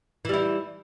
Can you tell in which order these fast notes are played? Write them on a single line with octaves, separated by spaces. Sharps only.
E3 G3 E4